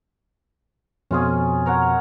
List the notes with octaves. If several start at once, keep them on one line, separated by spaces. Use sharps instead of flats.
F2 B2 C#4 F4 G#4
A#4 C#5 F#5